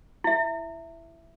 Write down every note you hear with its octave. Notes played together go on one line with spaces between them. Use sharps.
E4 E5